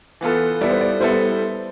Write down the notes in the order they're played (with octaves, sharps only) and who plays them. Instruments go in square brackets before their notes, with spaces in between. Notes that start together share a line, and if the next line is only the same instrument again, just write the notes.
[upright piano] E3 B3 F4 A4
[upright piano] G3 B3 E4 A4 [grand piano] D5
[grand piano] C5
D5
[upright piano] G3 B3 E4 A4 [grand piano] C5